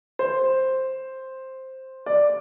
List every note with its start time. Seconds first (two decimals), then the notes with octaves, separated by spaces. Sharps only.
0.19 C5
2.06 D5